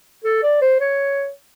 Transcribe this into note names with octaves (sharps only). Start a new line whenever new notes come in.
A4
D5
C5
C#5